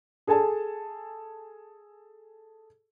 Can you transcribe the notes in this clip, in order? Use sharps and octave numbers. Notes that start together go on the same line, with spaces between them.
G#4 A4 G#5 A5